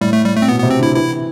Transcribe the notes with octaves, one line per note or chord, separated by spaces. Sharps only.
A2 G3
A3
G3
A3
C4
B2 B3
B3
C3
C4
D3 E4
E3 E4